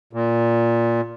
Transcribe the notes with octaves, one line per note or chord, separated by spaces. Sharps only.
A#2